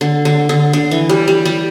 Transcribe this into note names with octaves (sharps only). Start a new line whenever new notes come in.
D3
D3
D3
D3
E3
G3
G3
G3